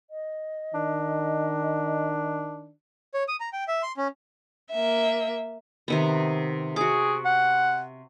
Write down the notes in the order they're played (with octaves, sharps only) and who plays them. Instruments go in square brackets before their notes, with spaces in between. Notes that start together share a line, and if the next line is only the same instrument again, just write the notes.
[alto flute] D#5
[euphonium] D#3 [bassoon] D4
[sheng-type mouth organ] C#5
D#6
A#5
G5
E5
C6
C#4
[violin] A#3 E5
[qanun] C3 D#3 B3
[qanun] F#4 D6 [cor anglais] G#4
[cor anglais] F#5